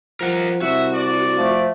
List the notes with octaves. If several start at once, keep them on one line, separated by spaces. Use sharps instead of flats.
F3 A#4 F#5
C2 F#4 E5
D5
F3 A3